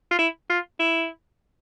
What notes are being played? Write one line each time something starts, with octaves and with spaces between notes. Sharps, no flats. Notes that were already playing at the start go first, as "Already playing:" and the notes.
F4
E4
F4
E4